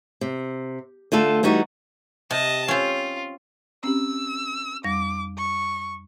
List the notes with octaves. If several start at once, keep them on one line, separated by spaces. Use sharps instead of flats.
C3
D3 A3 F4 A4
E3 G3 D#4 F#4
C3 D#5 A5
C4 C#4 F4
C4 C#4 G4 E6
F2 G3 D6 A#6
C#6